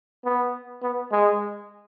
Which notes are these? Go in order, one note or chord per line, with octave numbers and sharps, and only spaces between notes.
B3
B3
G#3